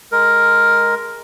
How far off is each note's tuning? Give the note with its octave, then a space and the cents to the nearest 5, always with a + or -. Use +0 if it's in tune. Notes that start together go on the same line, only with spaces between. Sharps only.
G#3 +0 A#4 +5